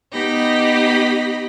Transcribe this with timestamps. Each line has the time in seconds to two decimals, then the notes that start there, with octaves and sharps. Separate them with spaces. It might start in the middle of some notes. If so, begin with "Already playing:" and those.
0.13 B3 D#4 G4 D#5 B5